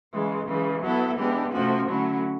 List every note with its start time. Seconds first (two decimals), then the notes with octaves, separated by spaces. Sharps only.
0.12 C#3 E3 G#3
0.47 C#3 E3 G#3
0.83 F#3 B3 E4 A4
1.18 E3 G#3 B3 D4 G4
1.52 C3 F3 A3 C#4 F#4
1.88 D3 F#3 A3 C#4 E4